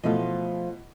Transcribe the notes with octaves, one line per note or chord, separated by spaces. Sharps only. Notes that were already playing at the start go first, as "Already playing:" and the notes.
B2 E3 F3 A3 F4 D#5